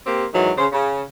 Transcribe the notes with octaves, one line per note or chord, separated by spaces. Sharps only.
A#3 C4 G4
G#2 D#3 E3 F#3
C#3 C5
C#3